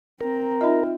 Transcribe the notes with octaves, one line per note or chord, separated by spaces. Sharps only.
C4 A#4
D#4 F4 D#5 E5